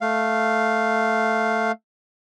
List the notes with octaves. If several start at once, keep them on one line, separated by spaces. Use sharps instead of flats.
A3 F5